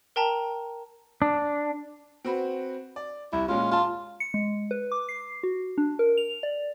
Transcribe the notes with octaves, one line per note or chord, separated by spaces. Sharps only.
A#4 G5 A5 A#5
D4
C4 F#4 B4
D5
C2 E4
A#2 G#3 C#4 F4
F4 A5 C6
C#7
G#3
B4
D6
C7
F#4
D4
A#4
F7
D5